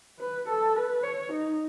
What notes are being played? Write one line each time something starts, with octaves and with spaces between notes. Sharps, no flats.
B4
A4
B4
C#5
D#4